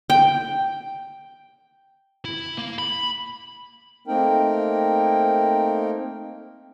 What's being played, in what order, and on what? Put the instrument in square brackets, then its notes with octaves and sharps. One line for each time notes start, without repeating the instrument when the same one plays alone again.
[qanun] G5
[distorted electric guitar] E4
A#3
B5
[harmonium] A3 A#3 C4 D#4 A#4 G5